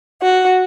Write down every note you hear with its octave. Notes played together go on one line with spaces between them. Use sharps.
F#4